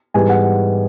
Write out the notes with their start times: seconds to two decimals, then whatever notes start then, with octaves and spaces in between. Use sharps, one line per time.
0.14 G#2 E3 G3 B3 G#5
0.29 F#5